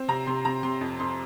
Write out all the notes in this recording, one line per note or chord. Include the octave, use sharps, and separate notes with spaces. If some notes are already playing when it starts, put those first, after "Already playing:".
Already playing: C4
C3 A#5
C3 C6
C3 A#5
C3 C6
F2
F2 C6